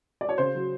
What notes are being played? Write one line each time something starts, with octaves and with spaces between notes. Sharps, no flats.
D5
C#5
C#3 C5
F#3